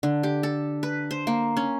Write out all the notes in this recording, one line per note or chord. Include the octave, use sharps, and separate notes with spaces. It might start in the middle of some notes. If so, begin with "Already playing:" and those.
D3
G4
A4
B4
C5
A#3
C#4